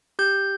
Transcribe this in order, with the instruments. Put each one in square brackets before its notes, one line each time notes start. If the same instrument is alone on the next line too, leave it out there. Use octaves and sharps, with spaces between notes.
[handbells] G4 G6